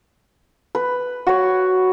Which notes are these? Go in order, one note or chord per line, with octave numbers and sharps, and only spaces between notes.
B4
F#4 C#5